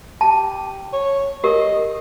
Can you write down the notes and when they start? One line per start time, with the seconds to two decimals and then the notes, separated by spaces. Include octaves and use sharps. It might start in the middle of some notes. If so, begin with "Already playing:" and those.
0.21 G4 A5
0.93 C#5
1.44 G4 A#4 D#5